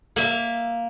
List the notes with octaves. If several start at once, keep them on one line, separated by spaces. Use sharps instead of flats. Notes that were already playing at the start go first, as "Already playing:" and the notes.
A#3 E5